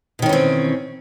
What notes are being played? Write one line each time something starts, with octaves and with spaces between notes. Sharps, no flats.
B2 D#3 E3 C4 C#4